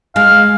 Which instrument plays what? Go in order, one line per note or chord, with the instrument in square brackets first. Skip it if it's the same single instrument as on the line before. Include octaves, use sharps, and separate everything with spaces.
[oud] G#3 [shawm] F5